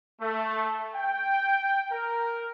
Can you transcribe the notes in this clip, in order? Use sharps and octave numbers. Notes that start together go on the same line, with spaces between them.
A3
G5
A#4